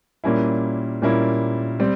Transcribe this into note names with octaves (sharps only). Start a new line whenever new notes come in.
A#2 G3 A#3 C#4 E4
A#2 G3 A#3 C#4 E4
G3 C4